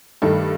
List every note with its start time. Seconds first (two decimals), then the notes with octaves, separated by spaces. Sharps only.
0.22 G2 D#3 A3 A4